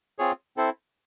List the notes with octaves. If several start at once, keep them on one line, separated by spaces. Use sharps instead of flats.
C4 F4 G#4 C#5
C4 E4 A4 C5